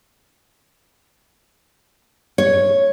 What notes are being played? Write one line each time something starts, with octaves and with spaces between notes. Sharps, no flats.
C#5